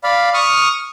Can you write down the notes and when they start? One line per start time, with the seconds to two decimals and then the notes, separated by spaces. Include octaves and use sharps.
0.04 D5 F5 B5
0.34 C#6 D#6 F6